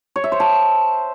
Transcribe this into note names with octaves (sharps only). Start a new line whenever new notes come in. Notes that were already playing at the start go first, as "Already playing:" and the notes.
C#5
E5
C5
A5